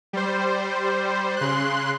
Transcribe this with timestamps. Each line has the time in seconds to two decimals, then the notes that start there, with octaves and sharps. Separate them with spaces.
0.13 G3 C5
1.37 C#3 C6 F#6